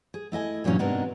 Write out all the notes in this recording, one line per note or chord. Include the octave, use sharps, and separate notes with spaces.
G#4
A3 E4 D#5 G#5
G2 A#2 E3 F#3 C#4 D#4
G#2 C3 B3 D4 D#4 A#4